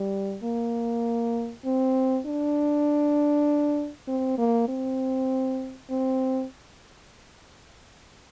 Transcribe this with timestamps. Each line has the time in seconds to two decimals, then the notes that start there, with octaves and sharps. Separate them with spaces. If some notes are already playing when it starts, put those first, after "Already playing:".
Already playing: G3
0.44 A#3
1.65 C4
2.26 D4
4.08 C4
4.38 A#3
4.68 C4
5.90 C4